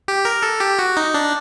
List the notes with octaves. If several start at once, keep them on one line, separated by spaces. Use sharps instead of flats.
G4
A#4
A4
G4
F#4
D#4
D4